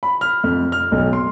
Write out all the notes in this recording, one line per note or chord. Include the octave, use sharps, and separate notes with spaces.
B5
F6
F2
F6
B1
C6